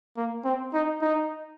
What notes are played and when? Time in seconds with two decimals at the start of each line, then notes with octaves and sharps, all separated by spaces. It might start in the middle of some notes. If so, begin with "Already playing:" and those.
0.17 A#3
0.45 C4
0.74 D#4
1.02 D#4